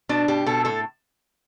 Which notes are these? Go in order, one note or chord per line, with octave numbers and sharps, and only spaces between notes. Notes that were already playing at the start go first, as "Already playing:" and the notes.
B2 D4
B2 G4
B2 A4
A2 A4